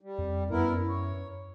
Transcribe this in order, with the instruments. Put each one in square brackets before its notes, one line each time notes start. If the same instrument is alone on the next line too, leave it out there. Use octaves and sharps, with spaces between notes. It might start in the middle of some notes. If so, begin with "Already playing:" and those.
[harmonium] G3
[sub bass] F2
[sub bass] F#2 [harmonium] B3 E4 A#4
[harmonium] C#5